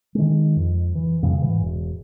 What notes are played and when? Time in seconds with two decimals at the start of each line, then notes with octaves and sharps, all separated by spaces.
0.15 D#3 G#3
0.56 F2
0.95 E3
1.22 F2 C#3 G3
1.42 G#2 E3
1.59 E1